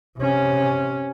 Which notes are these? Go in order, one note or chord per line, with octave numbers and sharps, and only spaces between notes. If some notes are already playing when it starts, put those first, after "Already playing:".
C3 C#4